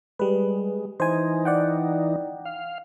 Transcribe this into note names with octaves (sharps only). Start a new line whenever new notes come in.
G3 G#3 B4
E3 D#4 C5 G#5
D5 F#5 G5
F5